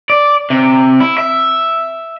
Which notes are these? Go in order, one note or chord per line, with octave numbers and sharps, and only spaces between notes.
D5
C3
E4
E5